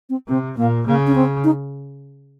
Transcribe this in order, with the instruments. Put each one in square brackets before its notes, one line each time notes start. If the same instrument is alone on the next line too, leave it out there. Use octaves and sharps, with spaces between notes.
[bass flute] C4
[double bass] C3 [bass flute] C4
[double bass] A#2 [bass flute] A#3
[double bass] C#3 [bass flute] A#3
[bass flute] C#4
C4
D#4